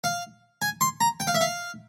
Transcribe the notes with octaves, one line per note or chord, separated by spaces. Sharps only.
F5
G#5
C6
A#5
G5
F5
E5
F5